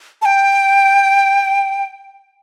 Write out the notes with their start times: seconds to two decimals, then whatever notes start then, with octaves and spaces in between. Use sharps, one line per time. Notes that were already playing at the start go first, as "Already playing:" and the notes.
0.22 A5
0.25 G5